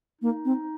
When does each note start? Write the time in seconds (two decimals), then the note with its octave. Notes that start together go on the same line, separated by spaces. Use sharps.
0.21 A#3 D#4
0.45 C4